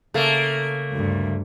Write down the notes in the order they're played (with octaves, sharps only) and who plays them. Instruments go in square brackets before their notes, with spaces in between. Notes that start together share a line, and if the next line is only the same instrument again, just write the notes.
[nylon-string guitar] C#3 A4 F5 [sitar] A3 A#3
[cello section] D2 G2